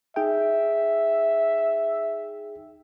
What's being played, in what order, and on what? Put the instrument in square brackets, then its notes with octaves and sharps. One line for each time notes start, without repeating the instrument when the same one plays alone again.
[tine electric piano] D#4 G#4 G5 [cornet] E5